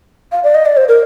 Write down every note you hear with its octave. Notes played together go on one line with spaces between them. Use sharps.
F5
D5
D#5
D5
C5
A#4